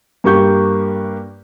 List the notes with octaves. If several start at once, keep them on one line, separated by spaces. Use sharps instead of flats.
G2 A#3 G4 C#6 G6